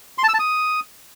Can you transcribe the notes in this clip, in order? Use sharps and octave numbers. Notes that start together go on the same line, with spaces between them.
C6
A5
E6
A5
D#6